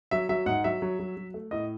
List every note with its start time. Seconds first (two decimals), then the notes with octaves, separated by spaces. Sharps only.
0.11 F#3 E5
0.29 F#3 E5
0.46 G#2 F#5
0.64 F#3 E5
0.82 F#3
0.99 F#3
1.17 F#3
1.34 A3
1.51 A2 D#5